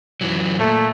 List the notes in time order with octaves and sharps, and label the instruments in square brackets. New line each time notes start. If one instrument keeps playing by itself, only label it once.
[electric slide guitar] F#2 E3 F#3
[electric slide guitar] A#2 [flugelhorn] A3